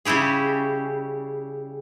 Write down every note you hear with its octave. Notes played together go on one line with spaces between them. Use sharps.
C#3 G3 E4 G4 G#4